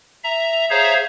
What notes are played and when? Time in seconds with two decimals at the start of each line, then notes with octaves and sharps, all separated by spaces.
0.24 E5 A#5
0.70 G#4 C5 C#5 E5 F5 A#5